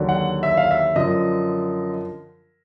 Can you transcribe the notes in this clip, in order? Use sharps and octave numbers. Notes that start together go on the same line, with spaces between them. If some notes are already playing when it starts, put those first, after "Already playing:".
Already playing: D#2 D3 F#3
F#5
E5
F5
E5
F#2 D3 F3 D#5